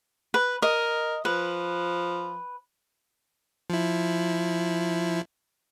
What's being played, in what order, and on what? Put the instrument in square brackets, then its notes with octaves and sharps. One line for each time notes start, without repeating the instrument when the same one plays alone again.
[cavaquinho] B4
[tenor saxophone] A#4 [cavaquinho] D#5
[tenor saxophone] F3 [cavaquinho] B4
[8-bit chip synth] F3 E4